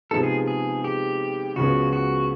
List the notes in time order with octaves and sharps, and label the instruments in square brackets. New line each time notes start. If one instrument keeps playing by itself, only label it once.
[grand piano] C3 F3 G#3 B3 D#4 [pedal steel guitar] A4
[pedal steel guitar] G#4
G#4
G4
[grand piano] C#2 C#3 F3 G#3 B3 [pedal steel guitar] F#4
[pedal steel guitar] F#4